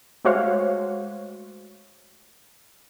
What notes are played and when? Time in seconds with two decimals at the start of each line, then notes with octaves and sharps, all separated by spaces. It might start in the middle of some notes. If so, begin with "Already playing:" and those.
0.25 G#3 A3 F#4 C5 C#5 F5